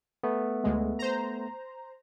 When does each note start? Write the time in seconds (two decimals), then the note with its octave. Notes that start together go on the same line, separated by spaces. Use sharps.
0.23 A3 B3
0.64 D2 G#3
0.99 C5 A#5